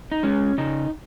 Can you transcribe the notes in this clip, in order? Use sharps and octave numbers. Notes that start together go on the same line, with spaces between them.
D#4
G#3 C#4
C#3 D#4